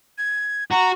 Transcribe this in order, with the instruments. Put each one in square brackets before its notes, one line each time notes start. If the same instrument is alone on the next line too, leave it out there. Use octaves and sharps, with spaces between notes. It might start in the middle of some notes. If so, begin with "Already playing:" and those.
[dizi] G#6
[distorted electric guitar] F#4 [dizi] A#5